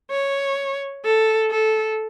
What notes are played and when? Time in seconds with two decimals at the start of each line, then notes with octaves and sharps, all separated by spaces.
0.11 C#5
1.04 A4
1.51 A4